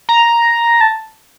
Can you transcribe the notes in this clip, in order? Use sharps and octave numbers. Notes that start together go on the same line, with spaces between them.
A#5
A5